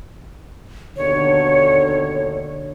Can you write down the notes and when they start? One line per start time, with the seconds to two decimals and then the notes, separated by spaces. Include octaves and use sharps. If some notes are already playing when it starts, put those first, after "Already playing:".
0.97 D#2 B2 D3 C#5